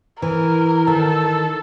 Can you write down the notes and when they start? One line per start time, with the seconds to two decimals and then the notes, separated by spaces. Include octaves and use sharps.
0.22 E3 A#4
0.87 D#3 A4